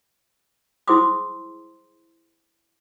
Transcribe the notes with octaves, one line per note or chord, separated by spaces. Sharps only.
E4 G#4 C5 C6 D6 D#6